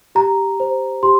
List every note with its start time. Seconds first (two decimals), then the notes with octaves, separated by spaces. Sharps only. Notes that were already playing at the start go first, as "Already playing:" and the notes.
0.15 G4 A#5
0.60 C5
1.03 G4 C6